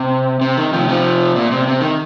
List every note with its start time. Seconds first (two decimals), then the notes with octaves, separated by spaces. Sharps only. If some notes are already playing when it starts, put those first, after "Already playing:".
Already playing: C3
0.41 C3
0.57 D#3
0.73 C3 F3
0.89 C3 F3
1.36 A#2
1.52 C3
1.68 C3
1.81 D#3